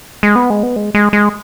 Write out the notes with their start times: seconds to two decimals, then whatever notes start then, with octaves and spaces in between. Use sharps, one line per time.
0.23 G#3
0.36 B3
0.50 G#3
0.63 B3
0.76 G#3
0.95 G#3
1.13 G#3